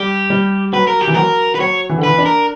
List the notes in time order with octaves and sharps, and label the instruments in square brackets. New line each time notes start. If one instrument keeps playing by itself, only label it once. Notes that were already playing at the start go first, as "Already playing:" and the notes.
Already playing: [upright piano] G3 [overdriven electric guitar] G4
[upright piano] G3
[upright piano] F#3 [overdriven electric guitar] B4
[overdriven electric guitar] A#4
G4
[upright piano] E3
[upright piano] F#3 [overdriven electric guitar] A#4
[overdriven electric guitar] B4
[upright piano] F#3 [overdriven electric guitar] C#5
[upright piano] E3
D3
[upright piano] E3 [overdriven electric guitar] B4
[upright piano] D4
[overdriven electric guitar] A#4